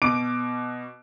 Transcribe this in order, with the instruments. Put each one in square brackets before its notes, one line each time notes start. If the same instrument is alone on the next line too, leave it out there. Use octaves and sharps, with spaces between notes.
[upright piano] B2 D6 D7